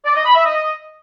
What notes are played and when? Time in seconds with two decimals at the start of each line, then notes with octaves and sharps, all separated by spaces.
0.05 D5
0.15 D#5
0.25 B5
0.35 E5
0.45 D#5